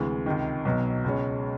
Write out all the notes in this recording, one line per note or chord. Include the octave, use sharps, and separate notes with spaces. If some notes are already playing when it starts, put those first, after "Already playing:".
Already playing: D2 C3 E3 G#3
C#2 C3 D#3
B1 B2 F#3 B3
C#2 B2 G#3 C#4